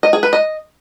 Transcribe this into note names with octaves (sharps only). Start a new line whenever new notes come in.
D#5
G#4
B4
D#5